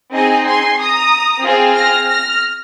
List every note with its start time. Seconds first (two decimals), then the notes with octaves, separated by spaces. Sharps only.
0.13 C4 D#4 G#4 D#5 G#5
0.45 G#5 C6
0.78 A#5 D#6
1.43 C4 F4 G#4
1.75 F6 A#6
2.07 F6 A#6